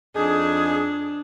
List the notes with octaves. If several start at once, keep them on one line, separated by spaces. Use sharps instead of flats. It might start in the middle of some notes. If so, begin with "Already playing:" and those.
F2 D4 D#4 G#4